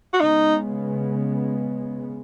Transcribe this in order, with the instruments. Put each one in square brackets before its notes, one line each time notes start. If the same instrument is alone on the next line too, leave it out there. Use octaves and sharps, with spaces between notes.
[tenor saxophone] F#4
[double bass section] C#3 G#3 B3 [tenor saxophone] D#4